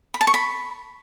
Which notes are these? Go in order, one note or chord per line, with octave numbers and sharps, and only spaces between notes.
B5
A5
C#6
B5